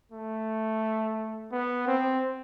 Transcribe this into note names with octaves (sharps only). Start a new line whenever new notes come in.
A3
B3
C4